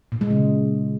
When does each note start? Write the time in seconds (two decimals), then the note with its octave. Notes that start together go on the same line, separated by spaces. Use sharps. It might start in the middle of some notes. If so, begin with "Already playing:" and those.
0.12 A#2
0.21 G#3
0.30 C#3